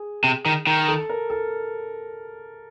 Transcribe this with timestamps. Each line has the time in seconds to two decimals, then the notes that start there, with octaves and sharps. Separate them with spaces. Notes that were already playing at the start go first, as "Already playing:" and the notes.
Already playing: G#4
0.24 C3
0.46 D#3
0.67 D#3
0.88 A4
1.09 A#4
1.30 A4